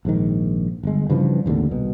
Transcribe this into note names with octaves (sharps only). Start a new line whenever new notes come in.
A#1 G#2 D#3
G1 G#3
G2 C#3 E3 F3
A1 D#2 B2 D3
C2 B2